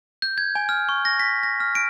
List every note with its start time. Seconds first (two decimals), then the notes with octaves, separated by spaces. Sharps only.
0.22 G6
0.38 G#6
0.55 G#5
0.69 F6
0.89 C#6
1.05 A#6
1.19 B6
1.43 A#6
1.60 F6
1.75 D7